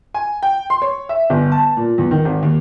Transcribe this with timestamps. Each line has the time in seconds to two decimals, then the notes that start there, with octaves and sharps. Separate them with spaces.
0.14 G#5
0.43 G5
0.70 C6
0.82 C#5
1.09 E5
1.30 G1
1.52 A5
1.77 A#2
1.98 E2
2.11 D#3
2.25 G#1
2.43 D#2